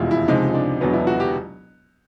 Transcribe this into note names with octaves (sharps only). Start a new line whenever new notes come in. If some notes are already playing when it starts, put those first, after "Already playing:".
Already playing: F1 E2 B2 G#3 E4 F4
E4
C#2 C3 F3 G#3 D#4
D#4
D4
E1 E2 B2 F#3 B3 D4
E4
F#4
G4